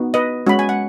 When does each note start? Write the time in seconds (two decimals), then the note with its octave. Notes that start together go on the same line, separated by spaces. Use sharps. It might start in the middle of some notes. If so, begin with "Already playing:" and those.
Already playing: B3 D#4 F#4
0.14 B4 D#5
0.47 G#3 C#4 F#4 B5
0.59 G#5
0.69 F#5